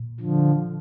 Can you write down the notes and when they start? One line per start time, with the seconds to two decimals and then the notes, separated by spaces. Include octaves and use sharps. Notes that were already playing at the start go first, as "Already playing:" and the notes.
Already playing: A#2
0.20 D3 F3